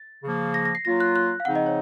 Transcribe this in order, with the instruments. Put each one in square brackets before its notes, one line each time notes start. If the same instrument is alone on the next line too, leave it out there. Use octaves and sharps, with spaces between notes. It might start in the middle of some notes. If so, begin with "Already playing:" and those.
Already playing: [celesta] A6
[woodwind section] C#3 F3 A#3
[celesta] A#6
A#6
C7
[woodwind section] F#3 A#3 F4 [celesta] A#6
[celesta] F#6
F#6
F5
[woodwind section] C#3 F3 C4 D#4 [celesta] F#5
[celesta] D#5
C#5